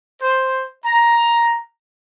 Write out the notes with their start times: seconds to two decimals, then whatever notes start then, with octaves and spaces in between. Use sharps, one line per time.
0.20 C5
0.84 A#5